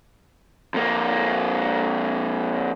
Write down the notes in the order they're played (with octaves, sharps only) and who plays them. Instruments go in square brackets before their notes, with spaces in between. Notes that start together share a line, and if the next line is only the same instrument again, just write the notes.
[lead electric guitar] F2 A#3